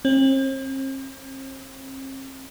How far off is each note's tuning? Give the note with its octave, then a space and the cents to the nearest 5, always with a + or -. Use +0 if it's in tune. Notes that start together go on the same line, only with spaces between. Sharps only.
C4 +40